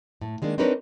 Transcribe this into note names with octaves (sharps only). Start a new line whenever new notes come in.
A2
D#3 G#3 A#3 D4
C4 D4 D#4 A#4 B4 C#5